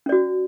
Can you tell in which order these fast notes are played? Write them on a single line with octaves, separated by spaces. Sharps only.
C#4 D5 F#4